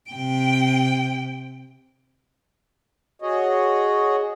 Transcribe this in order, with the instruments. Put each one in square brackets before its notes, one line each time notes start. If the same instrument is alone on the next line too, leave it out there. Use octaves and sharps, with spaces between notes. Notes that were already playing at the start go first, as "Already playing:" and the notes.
[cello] C3 G5
[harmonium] F#4 G#4 C#5 D#5